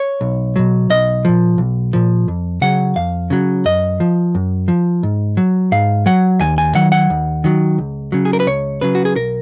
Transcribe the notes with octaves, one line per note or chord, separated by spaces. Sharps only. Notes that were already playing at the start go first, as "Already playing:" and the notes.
Already playing: C#5
B1
B2 F#3
B1 D#5
A#2 F3
B1
A#2 F3
F2
C#3 F#3 F#5
F2 F5
C#3 F#3
F#2 D#5
F3
F#2
F3
G#2
F#3
G#2 F5
F#3 F#5
D#2 G#5
G#5
D#3 F#3 F#5
F#5
D#2
D#3 F#3
C#2
C#3 F#3
G#4
A#4
B4
C#2 C#5
C#3 F#3 B4
F#4
G#4
B1 A#4